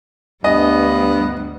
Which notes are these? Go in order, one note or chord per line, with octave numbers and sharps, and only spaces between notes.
D2 G2 G3 B3 D#5